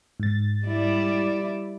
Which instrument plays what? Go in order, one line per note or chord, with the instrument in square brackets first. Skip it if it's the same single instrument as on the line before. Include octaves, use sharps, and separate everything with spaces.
[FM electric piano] G#2 A6
[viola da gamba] G3 E4 D5